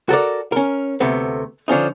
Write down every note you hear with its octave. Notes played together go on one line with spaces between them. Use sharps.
F#4 A4 A#4 D5
C#4 A#4
D2 C3 A3 B3
D3 F3 C#4 D#4